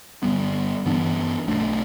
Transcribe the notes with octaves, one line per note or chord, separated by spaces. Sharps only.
G1 G2 G3 B3
G2 E3 B3 D4
B1 B2 A3 D4